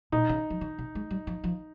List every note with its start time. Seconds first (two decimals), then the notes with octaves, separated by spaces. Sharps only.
0.12 A#2 D#4
0.29 C#3
0.50 F3
0.61 D#3
0.79 C3
0.95 G#3
1.11 G3
1.27 F3
1.44 F3